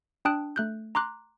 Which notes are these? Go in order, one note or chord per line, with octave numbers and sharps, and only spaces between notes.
D4 G5 A5 D#6 F#6 D7
A3 F#6 G6
A#5 C6 D6 F#6